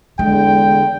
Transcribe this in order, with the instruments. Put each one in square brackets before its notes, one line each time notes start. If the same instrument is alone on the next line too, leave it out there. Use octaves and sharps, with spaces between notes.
[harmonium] E2 D3 [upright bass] G#3 [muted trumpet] G5